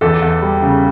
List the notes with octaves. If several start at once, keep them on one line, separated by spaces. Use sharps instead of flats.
E2 A4
E2
G3
C#3